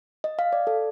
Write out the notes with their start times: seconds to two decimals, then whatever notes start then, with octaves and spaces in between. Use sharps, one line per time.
0.24 D#5
0.39 F5
0.53 D5
0.67 A4